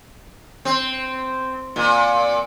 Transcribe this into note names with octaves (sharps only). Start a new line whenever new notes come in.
C4
A#2